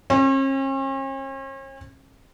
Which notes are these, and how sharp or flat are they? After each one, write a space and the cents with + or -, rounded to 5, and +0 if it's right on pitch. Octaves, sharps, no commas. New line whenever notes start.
C#4 -45